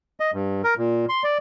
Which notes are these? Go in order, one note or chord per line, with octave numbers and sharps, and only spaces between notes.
D#5
G2
A#4
A#2
C6
D5